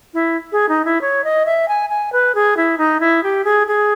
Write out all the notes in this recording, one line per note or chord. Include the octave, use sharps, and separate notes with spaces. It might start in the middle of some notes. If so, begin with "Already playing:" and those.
E4
G#4
D#4
E4
C#5
D#5
E5
G#5
G#5
B4
G#4
E4
D#4
E4
G4
G#4
G#4